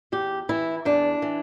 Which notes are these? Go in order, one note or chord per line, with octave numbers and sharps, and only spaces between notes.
E2 G4
E3 E4
E2 D4
E3